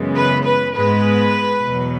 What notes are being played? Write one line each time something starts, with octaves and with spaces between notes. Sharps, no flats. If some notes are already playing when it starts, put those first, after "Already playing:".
Already playing: F#2 C#3 E3 G#3 B3
B4
B4
G#2 G#3 B3 B4
E2 B2 F#3